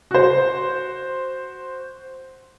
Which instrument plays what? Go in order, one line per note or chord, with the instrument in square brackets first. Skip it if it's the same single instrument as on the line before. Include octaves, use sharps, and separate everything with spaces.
[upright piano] F#4 C5